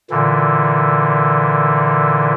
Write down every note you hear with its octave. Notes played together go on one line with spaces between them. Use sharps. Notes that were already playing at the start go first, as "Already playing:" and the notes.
A#2 D3 E3